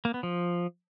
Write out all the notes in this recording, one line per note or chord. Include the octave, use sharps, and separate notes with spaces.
A#3
B3
F3